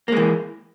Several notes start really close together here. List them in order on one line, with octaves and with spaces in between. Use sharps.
A#3 G#3 E3